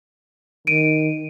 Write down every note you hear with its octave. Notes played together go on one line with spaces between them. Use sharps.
D#3 D7 D#7